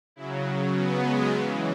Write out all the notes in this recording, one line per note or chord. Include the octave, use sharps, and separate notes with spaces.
C#3 F#3 E4
B3
G#3
C#3 E3